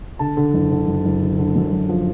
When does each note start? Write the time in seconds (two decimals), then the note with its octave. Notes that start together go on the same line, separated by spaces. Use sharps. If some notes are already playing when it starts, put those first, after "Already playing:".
0.19 D3 A5
0.37 D3
0.53 F#1
0.71 D3
0.87 F#1
1.04 F#1
1.21 D3
1.38 D3
1.56 F#2
1.72 F#1
1.89 F3